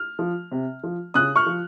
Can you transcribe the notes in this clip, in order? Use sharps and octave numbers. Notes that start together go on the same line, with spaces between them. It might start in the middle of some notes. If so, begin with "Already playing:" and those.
Already playing: F6
F3
C3
F3
C#3 D#6 F#6
C#6 F6
F3